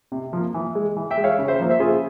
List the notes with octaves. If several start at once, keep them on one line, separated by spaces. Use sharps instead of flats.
C3
F3 A#3
E3
G#3
E3
E5 G5
G#3
C#5 F5
C#3
C5 E5
F3 A#3
C5 E5
C#3 F4 G#4